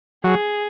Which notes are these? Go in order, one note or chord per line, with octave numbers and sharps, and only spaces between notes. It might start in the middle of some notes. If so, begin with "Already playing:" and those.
F#3 G#4